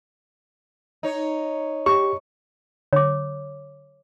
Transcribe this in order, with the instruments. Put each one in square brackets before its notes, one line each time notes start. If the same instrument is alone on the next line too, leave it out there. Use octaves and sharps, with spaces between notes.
[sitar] D#4 C#5
[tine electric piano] G4 [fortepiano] C#6
[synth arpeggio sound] D3 [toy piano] C#5 D6